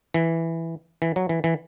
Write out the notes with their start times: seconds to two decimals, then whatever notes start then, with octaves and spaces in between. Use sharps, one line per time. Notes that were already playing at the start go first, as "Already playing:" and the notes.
0.14 E3
1.02 E3
1.16 F#3
1.29 E3
1.44 E3